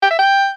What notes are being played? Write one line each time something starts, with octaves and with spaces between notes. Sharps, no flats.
G5
E5
G5